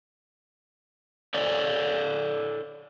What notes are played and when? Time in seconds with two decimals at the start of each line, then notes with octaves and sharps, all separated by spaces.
1.34 A4 C#5 D5